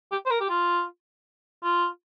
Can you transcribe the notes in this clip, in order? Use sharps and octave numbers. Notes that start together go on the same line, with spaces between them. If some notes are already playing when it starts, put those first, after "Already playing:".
G4
C5
A#4
G4
F4
F4